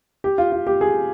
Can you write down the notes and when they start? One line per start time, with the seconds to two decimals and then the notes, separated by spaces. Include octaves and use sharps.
0.24 G4
0.38 F4
0.52 F4
0.67 G4
0.81 G#4